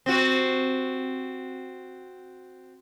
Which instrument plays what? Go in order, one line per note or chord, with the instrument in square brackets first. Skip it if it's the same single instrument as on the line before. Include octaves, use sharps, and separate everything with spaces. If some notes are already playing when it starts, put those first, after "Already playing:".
[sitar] C4 F#4